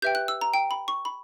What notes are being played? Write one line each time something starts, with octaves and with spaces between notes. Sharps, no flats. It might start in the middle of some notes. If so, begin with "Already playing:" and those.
G4 B4 E5 G5 G6
F#6
E6
A#5
G5
B5
C#6
B5